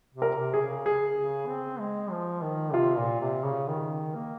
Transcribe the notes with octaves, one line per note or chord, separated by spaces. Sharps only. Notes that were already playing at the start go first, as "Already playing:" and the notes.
C3
A#4
C3
G#4
C#3
G#4
C#3
C4
G#3
F3
D#3
C3 F4
A#2
C3
C#3
D#3
A#3